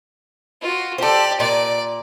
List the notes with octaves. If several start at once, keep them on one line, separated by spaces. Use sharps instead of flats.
F4 F#4
G4 A4 C5 D5
A#2 D5